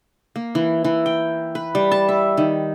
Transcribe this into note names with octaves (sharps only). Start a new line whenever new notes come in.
A#3
E3
E3
G5
B4
G3
A5
E5
D#3